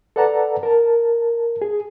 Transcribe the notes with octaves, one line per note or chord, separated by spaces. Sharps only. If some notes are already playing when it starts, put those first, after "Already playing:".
A4 B4 D5 F#5 A5 A#5
A#4 A5
G#4